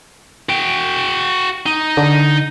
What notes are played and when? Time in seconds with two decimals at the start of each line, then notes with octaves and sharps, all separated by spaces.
0.49 F#4 G5
1.66 D#4
1.97 D3